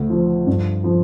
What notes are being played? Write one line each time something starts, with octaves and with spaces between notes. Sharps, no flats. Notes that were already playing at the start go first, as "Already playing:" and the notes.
Already playing: D2
F3
G2
F3